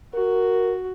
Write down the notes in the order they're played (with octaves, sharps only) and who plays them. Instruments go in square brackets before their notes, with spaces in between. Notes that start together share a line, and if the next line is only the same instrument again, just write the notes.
[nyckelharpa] F#4 [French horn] A#4